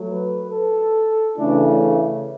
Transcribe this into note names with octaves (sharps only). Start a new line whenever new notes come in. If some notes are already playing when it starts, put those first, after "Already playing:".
Already playing: F#3 A3
B4
A4
C#3 E3 A3 C#4 D4 E4